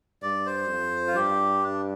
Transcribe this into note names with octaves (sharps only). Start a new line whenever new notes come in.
G2 D5
C5
F2
F4
G2 G4
D4